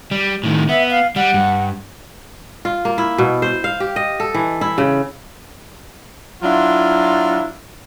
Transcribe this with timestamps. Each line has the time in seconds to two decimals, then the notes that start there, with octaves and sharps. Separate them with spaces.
0.11 G3
0.44 A2 D#3
0.69 B3 E5
0.91 F5
1.16 G3 F#5
1.34 G2
2.65 F4
2.85 A#3
2.98 E4
3.18 B2
3.42 C5
3.64 F5
3.80 G4
3.96 D#5
4.20 A4
4.34 E3
4.61 E4
4.78 C#3
6.42 F#3 D4 E4 F4